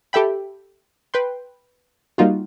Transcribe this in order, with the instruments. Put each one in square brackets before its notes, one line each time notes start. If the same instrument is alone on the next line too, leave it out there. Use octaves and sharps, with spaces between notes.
[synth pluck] G4 A4 E5 G5 B5
B4 G5 C6
G3 A#3 D#4 F4 F#4